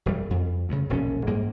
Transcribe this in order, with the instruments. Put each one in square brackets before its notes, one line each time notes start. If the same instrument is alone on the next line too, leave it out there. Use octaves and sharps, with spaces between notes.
[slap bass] E1 G3
F2
D2 G2 C#3
E1 A#1 B2 C#4
G#2 G3 G#3 A#3